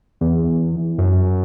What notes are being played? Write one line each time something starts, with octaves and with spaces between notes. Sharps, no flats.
E2
F#2